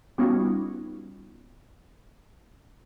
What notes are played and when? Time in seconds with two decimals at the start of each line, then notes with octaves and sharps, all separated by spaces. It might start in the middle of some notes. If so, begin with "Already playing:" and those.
0.18 G3 B3 C#4 D#4 F4 F#4